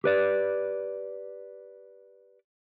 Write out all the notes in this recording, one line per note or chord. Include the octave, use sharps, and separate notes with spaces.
G4 B4 D5